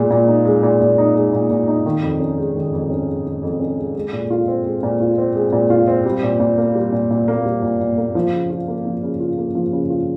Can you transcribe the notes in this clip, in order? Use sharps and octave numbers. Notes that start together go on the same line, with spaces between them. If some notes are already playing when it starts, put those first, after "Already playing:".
Already playing: A#2 G#3
A#2
D#4
G#3
A#2
A#2
D#4
G#3
A#2
A#2
D#4
D#3
F2
C#4
G#3
D#3
F2
C#4
G#3
D#3
F2
C#4
G#3
G#3
A#2
F4
C4
G#3
A#2
F4
C4
G#3
A#2
F4
C4
G3
A#2
A#2
A#3
G3
A#2
A#2
A#3
G3
A#2
A#2
A#3
F3
C#3
F4
A#3
F3
C#3
F4
A#3
F3
C#3
F4